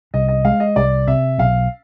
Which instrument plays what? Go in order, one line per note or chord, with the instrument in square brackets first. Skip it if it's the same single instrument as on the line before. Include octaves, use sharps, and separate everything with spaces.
[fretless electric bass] C2 [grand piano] D#5
[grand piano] D#5
[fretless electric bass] G#3 [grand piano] F5
[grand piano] D#5
[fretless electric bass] C2 [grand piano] D5
[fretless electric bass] C3 [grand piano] E5
[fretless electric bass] B1 [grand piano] F5